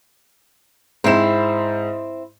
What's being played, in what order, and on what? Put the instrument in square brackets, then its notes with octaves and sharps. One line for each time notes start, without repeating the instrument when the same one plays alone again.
[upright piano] G#2 C5 E7 [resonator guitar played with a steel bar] C4 E4